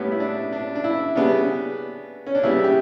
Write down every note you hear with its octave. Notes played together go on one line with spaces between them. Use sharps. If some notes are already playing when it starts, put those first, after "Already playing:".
Already playing: A2 G3 B3 C#4
E4
D4
D4
D4
E4
C#3 G3 B3 D4
C#4
D4
C#3 G3 B3 E4
G4